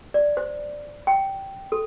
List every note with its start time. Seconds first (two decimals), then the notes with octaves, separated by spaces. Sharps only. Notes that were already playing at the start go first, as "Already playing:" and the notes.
0.14 D5
0.37 C5
1.07 G5
1.72 A4